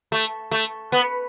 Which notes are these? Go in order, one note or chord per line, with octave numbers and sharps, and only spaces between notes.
A3
A3
B3